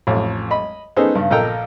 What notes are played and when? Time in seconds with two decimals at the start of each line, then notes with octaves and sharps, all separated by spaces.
0.07 A1 F2
0.51 D#5 B5
0.96 B3 C#4 D#4 G#4 A4 C5
1.15 G2 C#3
1.31 A#1 A4 A#4 D#5 G5 A#5